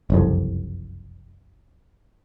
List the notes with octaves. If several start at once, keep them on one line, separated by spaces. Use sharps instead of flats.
F#1 C2 F2